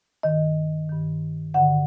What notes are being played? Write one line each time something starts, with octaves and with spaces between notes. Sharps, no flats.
G2 D#3 D#5
G2 D#3
G2 D3 F#5